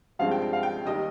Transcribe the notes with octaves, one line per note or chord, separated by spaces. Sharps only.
G2 F3 G#3 C4 F4 F5
G5
G5
F5
G5
D#2 D#3 G3 D#5